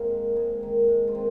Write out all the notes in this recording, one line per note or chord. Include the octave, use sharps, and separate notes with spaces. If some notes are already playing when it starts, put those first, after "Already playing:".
Already playing: G#2 A#3 C4 D#4 F4
D#3
G#2
D#3
G#2
F4
D#3 C4